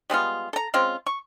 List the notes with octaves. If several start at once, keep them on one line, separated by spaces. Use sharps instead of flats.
G3 G#3 B3 F4
A4 A#5
G#3 C4 C#4 F4
C#6